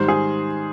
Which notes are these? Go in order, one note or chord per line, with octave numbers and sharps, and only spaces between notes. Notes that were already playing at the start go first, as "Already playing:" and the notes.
Already playing: G#2 D#3 G3 C5
G#4